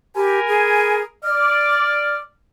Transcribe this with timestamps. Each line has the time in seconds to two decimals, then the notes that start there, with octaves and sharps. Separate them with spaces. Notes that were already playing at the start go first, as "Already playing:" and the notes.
0.16 G4 A#4 G#5 B5
0.48 G#4
1.24 D5 F6